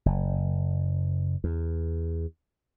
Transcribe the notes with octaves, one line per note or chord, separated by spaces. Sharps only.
F#1
E2